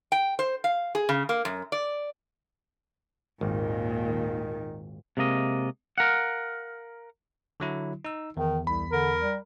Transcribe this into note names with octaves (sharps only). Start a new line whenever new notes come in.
G5
C5
F5
G#4
C#3
A#3
F#2
D5
G#1 D#2 A#2 D#3
C3 G#3 A#3 D#5
A#4 F5 F#5
D3 F#3 E4
D#4 E6
E2 D#3
C2 B5
D3 A#4
G3